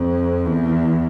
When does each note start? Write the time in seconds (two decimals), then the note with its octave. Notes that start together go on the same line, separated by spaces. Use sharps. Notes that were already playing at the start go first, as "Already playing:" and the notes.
Already playing: F2
0.45 E2